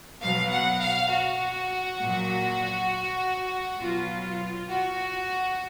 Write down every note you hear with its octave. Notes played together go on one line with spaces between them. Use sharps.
B2 F#3 F5
F#5
F5
F#4
A#2 F#3
B2 F#3 F4
F#4